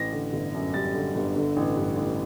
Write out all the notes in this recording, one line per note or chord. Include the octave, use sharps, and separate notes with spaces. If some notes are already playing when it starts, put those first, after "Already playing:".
Already playing: A1 A#6
D3
G1
F#2
G3 A6
D3
G1
D3
A1
G2
A1